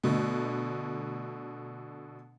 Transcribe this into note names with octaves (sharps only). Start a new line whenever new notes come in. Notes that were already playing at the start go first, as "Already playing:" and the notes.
B2 D3 A3